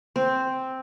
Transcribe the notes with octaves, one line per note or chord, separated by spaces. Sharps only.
C4